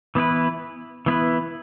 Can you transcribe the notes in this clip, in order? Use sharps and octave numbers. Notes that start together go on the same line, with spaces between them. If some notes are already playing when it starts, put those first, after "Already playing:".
E3 B3 E4 B4
E3 B3 E4 B4